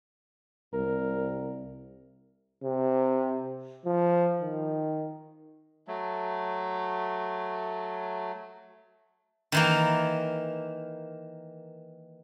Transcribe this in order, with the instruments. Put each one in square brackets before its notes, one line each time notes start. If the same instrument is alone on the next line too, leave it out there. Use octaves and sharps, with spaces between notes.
[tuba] C2 [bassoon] A#4
[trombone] C3
F3
D#3
[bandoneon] F#3 A3
[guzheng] D#3 E3 A#3